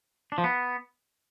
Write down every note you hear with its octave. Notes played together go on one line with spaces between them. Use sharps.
D4
F3
B3